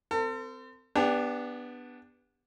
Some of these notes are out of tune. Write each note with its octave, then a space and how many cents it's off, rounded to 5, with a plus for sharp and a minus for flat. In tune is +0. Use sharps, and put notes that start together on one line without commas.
C4 -25 A4 +40
B3 +0 D4 +0 G4 +35